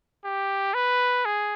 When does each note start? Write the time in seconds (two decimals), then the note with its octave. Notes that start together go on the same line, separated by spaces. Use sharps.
0.25 G4
0.74 B4
1.25 G#4